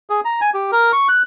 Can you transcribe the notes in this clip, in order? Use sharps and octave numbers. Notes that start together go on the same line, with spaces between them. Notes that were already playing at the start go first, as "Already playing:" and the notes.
G#4
A#5
G#5
G4
A#4
C#6
F#6